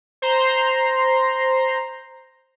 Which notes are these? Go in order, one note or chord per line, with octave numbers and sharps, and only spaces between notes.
C5 A#5 C6